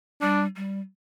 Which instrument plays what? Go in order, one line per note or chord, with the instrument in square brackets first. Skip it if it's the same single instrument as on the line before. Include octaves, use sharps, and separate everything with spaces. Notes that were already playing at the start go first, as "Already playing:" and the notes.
[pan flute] G3 [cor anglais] D4
[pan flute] G3